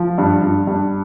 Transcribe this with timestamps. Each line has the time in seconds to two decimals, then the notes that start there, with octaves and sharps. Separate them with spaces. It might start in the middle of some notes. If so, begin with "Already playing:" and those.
Already playing: F3
0.18 G2
0.43 G2
0.67 G2